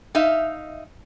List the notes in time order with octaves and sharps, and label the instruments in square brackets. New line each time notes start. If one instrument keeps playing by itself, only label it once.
[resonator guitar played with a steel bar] D#4 E5 F5